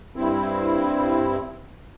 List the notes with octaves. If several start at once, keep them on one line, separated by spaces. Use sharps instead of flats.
G2 C4 E4